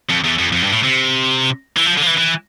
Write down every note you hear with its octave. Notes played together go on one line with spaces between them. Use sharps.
F2
E2
F2
F2
G2
A2
C3
E3
F3
D3
F3
E3
E3